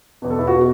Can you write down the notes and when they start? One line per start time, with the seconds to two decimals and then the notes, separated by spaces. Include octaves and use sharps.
0.22 E2 B2
0.31 A4
0.39 E4
0.47 F#4
0.56 B2